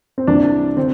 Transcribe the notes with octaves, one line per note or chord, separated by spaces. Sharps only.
C4
C2 C3 E3 D4
D3 C4